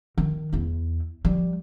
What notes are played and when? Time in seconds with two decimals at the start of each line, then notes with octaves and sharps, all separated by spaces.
0.18 D#3
0.53 E2 E4
1.25 F3 G3